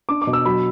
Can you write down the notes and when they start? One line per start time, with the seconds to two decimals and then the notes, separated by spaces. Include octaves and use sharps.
0.09 D4 D6
0.22 D6
0.27 B2
0.33 E6
0.45 F#3 B5